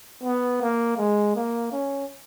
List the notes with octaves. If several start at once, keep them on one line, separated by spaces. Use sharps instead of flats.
B3
A#3
G#3
A#3
C#4